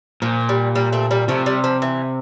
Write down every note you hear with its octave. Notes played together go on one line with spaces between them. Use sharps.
A#2 F3
G3
G3 A#3
A3 C4
G3 A#3
C3 F3 A3
G3
F3
E3